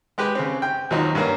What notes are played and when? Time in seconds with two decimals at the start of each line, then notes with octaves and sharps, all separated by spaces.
0.18 G#3 G4 B4
0.35 C#3 C4
0.62 G5
0.90 D#2 F3 F#3 D#4
1.15 G2 A#3 C#4